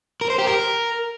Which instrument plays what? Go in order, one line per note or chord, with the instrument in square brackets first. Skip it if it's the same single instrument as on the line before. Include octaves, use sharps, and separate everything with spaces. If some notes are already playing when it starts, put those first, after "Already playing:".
[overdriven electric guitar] A#4
C5
G4
A#4